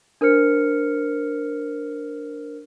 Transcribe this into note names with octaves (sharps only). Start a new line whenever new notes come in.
D4 A#4 C5 F6 C#7